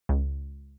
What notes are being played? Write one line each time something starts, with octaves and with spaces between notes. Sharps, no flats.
C#2